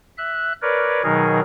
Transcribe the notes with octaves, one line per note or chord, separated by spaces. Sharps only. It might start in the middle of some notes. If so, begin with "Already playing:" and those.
E5 F#6
A#4 B4 C#5 D5
B2 D#3 F#3 D#4 G#4 A#4